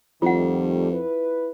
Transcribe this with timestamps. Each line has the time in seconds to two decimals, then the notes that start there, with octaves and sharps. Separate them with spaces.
0.22 F2 D#3 G3 A3 F4 F#5
0.91 E4 B4